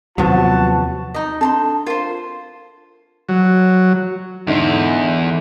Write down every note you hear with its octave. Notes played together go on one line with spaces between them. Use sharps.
D#2 C3 F3 F#3 B3 F#4 A5
D#4 D#5
C4 D4 A4 A5 A#5 C6
F4 A#4 C5
F#3
E2 G#2 D3